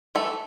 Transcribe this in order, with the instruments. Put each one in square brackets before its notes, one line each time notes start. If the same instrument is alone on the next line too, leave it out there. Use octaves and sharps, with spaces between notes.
[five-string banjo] E3 A3 A4